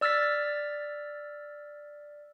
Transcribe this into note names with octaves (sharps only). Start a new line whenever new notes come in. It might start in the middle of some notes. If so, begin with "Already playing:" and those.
D5 E6 F6 A6 B6